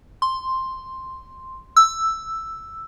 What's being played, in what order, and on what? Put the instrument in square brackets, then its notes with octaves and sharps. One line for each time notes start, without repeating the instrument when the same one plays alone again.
[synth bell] C6
E6